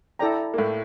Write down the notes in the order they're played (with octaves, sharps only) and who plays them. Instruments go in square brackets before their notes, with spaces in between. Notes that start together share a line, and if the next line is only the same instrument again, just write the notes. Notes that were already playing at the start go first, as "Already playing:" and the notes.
[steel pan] E4 A4 D5 G5 A#5
[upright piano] A#3
A2 A3